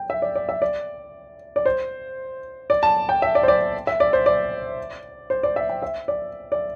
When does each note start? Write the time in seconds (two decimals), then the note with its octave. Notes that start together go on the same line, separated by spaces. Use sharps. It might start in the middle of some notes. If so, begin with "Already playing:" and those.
Already playing: G5
0.10 E5
0.22 D5
0.36 D5
0.49 E5
0.62 D5
1.56 D5
1.66 C5
2.70 D5
2.83 A5
3.09 G5
3.22 E5
3.35 D5
3.43 C5
3.48 D5
3.87 E5
4.00 D5
4.13 C5
4.26 D5
5.30 C5
5.43 D5
5.56 E5
5.69 G5
5.82 E5
6.08 D5
6.52 D5